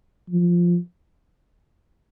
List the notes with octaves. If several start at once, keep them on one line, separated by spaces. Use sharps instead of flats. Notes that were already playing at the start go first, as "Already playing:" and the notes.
F3